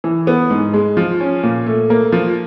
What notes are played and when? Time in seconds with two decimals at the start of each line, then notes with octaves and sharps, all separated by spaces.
0.04 E3
0.27 B3
0.50 G#2
0.74 G#3
0.97 F3
1.20 C#4
1.43 A#2
1.66 A3
1.90 A#3
2.12 F3